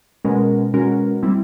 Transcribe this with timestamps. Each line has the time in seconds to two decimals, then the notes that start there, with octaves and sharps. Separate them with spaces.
0.24 B2 G#3 C#4 F#4 A#4
0.73 B2 G#3 C#4 F#4 A#4
1.23 G3 C4 E4